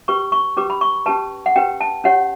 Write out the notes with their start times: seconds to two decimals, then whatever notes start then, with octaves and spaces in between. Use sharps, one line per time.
0.08 C#4 G4 B4 C#6
0.32 C#6
0.57 C#4 G4 B4 D6
0.70 B5
0.81 C#6
1.06 C#4 G4 B4 A5
1.46 F#5
1.56 C#4 G4 B4 G5
1.81 A5
2.04 C#4 G4 C#5 F#5